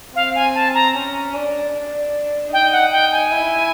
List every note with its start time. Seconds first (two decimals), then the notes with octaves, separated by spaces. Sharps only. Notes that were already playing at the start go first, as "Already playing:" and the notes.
0.15 C4 F5
0.35 G#5
0.55 A5
0.74 A#5
0.94 C#4
1.34 D4
1.74 D4
2.52 D#4 G5
2.72 F#5
2.92 G5
3.12 G#5
3.32 E4